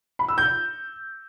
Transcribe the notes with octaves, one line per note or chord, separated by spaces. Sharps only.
B5
E6
G6